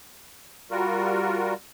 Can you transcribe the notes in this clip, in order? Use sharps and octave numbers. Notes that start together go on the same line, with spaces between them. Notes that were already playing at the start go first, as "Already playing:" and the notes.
G3 F4 F#4 A#4